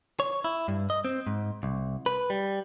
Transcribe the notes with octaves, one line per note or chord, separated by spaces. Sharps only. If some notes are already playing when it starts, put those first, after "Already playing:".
C#5
E4
G2
D#5
C4
G#2
C2
B4
G3